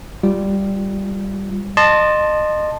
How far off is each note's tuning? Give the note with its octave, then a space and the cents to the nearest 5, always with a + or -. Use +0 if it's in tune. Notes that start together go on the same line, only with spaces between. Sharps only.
G3 +0 F4 +0
D#5 -30 A5 +0 C6 +10